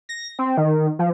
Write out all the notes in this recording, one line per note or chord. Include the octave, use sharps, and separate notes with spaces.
A#6
C4
D#3
F3